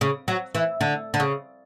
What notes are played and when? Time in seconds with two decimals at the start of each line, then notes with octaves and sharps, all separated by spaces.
0.01 C#3
0.28 F#3
0.55 E3
0.81 D3
1.14 D3
1.20 C#3